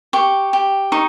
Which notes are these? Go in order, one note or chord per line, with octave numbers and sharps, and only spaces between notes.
G4 C#6
G4
D#4 C#6